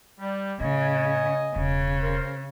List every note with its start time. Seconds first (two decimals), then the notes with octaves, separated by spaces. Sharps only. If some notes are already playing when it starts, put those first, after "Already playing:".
0.20 G3
0.60 A2 C#3 D#5 G#5
1.56 E1 C#3
2.02 A#4 C5